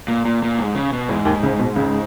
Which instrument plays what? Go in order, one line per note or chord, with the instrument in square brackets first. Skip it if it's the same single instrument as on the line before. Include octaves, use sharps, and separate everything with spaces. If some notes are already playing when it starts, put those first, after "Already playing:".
[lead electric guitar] A#2
A#2
A#2
G#2
C#3
B2
[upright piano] E2 E3 [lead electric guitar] G#2
[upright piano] D#2 D#3
C#2 C#3
B2
C#2 C#3